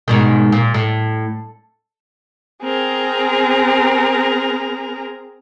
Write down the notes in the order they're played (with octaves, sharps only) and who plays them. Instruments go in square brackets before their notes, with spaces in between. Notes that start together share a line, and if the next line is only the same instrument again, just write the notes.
[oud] G#2 B2 D#3
A#2
A2
[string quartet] C4 G#4 A#4